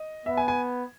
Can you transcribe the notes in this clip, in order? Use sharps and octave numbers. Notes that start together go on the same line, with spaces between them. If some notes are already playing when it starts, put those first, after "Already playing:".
Already playing: D#5
B3 E5
G#5
G#5